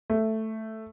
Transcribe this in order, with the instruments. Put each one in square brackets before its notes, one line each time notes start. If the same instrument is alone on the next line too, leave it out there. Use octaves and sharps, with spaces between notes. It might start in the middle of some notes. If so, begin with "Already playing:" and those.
[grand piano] A3